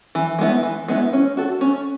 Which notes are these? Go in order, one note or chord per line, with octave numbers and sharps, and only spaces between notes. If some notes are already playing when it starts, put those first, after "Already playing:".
E3
G#3 B3 E4
E3
G#3 B3 E4
C#4
F#4 A4
C#4